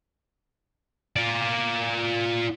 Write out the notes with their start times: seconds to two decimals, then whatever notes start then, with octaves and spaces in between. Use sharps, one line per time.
1.16 F4 D5